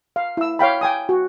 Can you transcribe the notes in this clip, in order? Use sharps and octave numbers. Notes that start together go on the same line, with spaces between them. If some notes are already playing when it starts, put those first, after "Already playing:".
F5
E4 E6
C#5 F5 G5 B5
G5 G#5 D#6
F#4